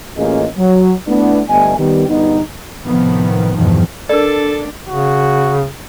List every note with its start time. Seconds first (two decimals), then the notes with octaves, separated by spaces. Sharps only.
0.17 A1 A#3 C#4 F4 G#4 D#5
0.58 F#3
1.07 A3 B3 D4 E4
1.49 G1 G3 A3 B3 D#5 G#5
1.78 D#3 G3 B3 G4
2.08 G1 E2 G3 B3 D#4
2.84 A2 C3 D#3 F3 B3
3.54 E2 G2 B2 D#3 F3
4.09 D4 A4 A#4 D5
4.88 C#3 F#4